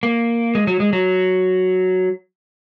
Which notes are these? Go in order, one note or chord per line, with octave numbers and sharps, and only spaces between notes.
A#3
G#3
F#3
G#3
F#3